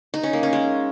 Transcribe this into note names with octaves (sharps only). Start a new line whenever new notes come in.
D#4
C#4
A#3
C#4
G#3